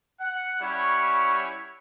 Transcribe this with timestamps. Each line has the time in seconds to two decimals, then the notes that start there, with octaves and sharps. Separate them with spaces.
0.20 F#5
0.61 G3 C#4 E4 C#5 F#5 C#6